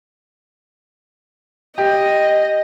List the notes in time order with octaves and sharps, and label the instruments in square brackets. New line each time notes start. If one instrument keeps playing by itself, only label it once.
[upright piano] G4 [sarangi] D#5